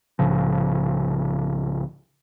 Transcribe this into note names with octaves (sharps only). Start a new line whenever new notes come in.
C2 A2 C#3 F3